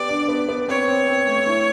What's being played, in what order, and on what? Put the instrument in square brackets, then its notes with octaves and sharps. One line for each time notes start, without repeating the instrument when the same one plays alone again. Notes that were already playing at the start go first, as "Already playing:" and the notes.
Already playing: [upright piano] B3 G4 [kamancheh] D5
[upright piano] D4
B3
B3
[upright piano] C4 [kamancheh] C#5
[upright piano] C4
C4
A3
E4